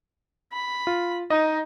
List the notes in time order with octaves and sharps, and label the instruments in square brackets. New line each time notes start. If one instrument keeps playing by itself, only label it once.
[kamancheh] B5
[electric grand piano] F4
[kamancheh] D#4 [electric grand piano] D#5